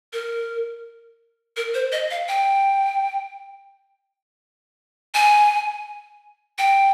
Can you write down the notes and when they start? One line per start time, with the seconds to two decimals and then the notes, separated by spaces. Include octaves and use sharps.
0.13 A#4
1.57 A#4
1.74 C5
1.92 D#5
2.11 F5
2.28 G5
5.15 G#5
6.58 G5